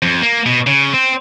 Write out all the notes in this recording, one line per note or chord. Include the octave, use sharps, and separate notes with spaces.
F2
A#3
B2
C#3
C4